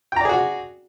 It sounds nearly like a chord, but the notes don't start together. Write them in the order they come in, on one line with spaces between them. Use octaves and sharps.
G5 A#5 D5 G#4 F#4